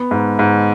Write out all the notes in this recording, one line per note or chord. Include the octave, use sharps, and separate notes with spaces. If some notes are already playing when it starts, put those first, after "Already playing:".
Already playing: B3
G#2
G#2